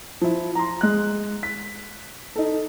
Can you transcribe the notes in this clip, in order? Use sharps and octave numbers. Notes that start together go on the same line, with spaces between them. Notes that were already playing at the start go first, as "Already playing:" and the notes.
F3 E4
A#5 C6
G#3 F#6
B6
D#4 A4